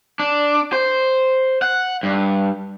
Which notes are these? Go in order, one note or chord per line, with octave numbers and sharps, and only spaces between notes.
D4
C5
F#5
G2